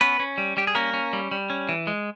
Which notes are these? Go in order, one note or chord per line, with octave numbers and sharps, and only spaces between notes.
B3 C#4 B4
C#4
G3
G3 G4
G#4
A#3 C#4 A#4
C#4
G3
G3
C#4
E3
G#3